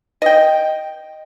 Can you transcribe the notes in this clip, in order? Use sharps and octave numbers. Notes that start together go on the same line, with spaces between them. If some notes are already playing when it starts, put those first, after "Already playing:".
D#5 G5